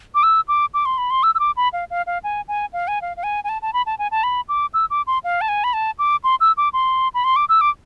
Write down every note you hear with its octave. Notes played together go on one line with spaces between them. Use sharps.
D6
E6
D6
D6
C6
B5
C6
E6
E6
D6
B5
F5
F5
F5
G#5
G#5
F5
G#5
F5
F5
G#5
G#5
A5
A5
B5
A5
G#5
A5
B5
D6
E6
D6
C6
F5
A5
G#5
B5
A5
D6
C6
E6
D6
C6
B5
C6
D6
E6
D6